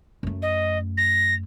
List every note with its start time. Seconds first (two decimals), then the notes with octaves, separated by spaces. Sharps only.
0.23 F#2 A3
0.42 D#5
0.97 A#6